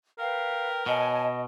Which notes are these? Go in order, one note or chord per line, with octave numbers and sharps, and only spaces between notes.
A#4 B4 F5 G5
B2 C#5 D#5 G#5 A5